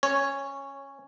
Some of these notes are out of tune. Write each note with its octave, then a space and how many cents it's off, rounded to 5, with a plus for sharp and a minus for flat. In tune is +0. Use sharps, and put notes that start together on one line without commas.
C#4 -15 C#5 +0